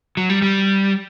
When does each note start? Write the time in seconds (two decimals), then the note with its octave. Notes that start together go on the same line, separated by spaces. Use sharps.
0.17 F#3
0.29 G3
0.42 G3